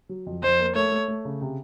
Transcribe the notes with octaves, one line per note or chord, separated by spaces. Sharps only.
F#3
F2
F2 C5
A#3
A3 C#5
A3
A3
C#3
C3